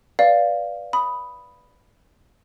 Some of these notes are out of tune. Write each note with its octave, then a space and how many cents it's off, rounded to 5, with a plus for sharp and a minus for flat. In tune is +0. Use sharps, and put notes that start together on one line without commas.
B4 +0 D5 +0 F5 +0
B5 +0 D#6 +0